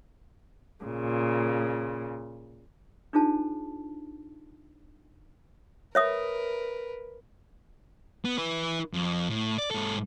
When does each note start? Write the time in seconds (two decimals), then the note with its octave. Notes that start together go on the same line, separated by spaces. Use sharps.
0.83 A#2 C#3
3.13 D4 D#4 F4 G#4 C5 A5
5.95 A#4 B4 C#5 E5 D#6
8.25 B3
8.38 E4 B4
8.93 F2
9.30 A2
9.58 D5
9.71 G#2 A4